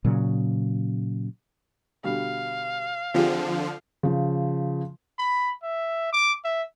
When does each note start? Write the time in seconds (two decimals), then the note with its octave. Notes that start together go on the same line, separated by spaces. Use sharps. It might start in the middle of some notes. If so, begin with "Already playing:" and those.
0.05 A#2 C#3 F#3
2.04 B2 D3 G3 F5
3.14 D3 F3 C4 F4 G4 G#4
4.03 C#3 F3
5.19 B5
5.63 E5
6.13 D6
6.44 E5